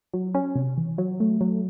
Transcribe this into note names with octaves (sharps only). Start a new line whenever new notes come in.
F#3
C#4
C3
E3
F#3
A3
F#3